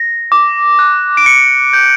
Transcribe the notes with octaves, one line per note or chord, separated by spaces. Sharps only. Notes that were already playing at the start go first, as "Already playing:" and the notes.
Already playing: A#6
D6
F#6
D7
D6 C#7
G6